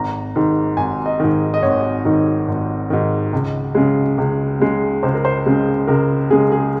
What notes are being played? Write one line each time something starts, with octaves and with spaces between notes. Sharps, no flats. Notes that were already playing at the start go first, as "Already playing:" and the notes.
Already playing: G#1 A#5
G#2 D#3
G#1 G#5
D#5
G#2 D#3
D#5
G#1 C#5
G#2 D#3
G#1
G#2 D#3
C#2
C#3 G#3
C#2
C#3 G#3
C#2 C5
A#4
C5
C#3 G#3
C#2 A#4
C#3 G#3 G#4
G#4